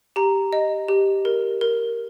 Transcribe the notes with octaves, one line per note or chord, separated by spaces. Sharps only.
G4 A#5
D#5
G4
A#4
A#4